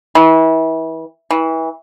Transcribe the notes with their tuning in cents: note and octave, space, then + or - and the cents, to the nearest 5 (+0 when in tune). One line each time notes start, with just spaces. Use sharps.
E3 -30
E3 -25